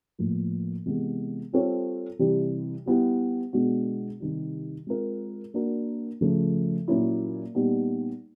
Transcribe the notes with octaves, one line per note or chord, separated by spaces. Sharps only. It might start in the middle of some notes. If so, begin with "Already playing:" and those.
A2 F3 A#3
C3 E3 G#3 B3
G3 C4 F4 A4 C#5
C3 E3 G3
G3 B3 E4 G4
B2 G#3 B3 D4 F#4
C3 D#3 G3
G#3 C4 F4 A#4
A#3 D4 F#4 A#4
C#3 F3 A3
A#2 F#3 A#3 C#4 E4
A#2 G3 B3 D#4